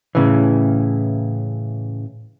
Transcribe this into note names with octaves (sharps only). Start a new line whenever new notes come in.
A2 C#3 E3